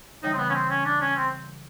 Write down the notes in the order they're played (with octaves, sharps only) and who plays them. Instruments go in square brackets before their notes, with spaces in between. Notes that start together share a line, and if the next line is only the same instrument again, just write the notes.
[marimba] C#3 E3 G3 [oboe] D#4
[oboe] C4
B3
C#4
C4
C#4
D4
C#4
C4